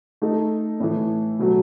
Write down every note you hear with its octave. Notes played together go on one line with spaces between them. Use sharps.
A3 D#4 A4
A2 E3 A3
B2 F#3 A3